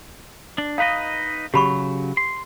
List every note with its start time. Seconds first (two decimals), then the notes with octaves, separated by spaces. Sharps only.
0.58 D4
0.78 D#4 B4 D#5 F5
1.54 C#3 F#3 G4 B5 C#6
2.17 C6